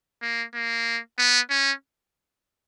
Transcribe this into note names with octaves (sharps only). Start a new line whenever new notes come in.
A#3
A#3
B3
C#4